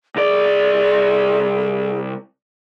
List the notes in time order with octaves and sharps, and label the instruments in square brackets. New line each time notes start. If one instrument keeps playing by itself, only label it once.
[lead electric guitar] C2 D5 [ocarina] G#4